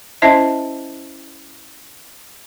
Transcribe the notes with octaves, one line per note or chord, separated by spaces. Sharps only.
C#4 E4 C5 D#5 E5 A5